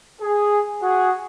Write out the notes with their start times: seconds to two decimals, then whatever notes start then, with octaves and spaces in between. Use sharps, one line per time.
0.19 G#4
0.82 F#4 G#4